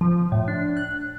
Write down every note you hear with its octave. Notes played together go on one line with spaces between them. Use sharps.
F3
A2
D4
F#6